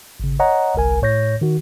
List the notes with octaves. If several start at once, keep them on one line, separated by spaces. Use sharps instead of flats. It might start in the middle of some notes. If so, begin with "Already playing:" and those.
G#1 C#3
C#5 D#5 F#5 A#5
G1 C2 A#4 G#5
A2 C#5 G6 A#6
D#3 F#4